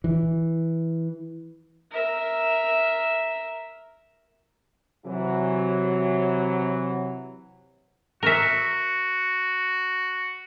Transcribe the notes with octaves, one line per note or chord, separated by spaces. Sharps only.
E3
A#4 E5
C3 E3 F#3
F#4 A#4 E5